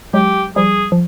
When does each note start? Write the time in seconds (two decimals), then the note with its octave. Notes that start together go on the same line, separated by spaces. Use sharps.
0.14 F#3 G#3 G4
0.56 F3 G3 G#4
0.92 F3